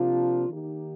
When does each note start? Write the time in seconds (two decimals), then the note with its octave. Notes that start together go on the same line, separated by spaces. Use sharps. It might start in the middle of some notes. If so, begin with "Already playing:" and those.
Already playing: C3 F3 A#3 D4 F4
0.49 D#3 A#3 D#4 G4